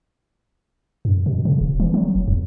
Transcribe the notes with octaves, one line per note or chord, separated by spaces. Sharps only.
F#2
B2
C#3
D#1
E3
F#3
E1
E2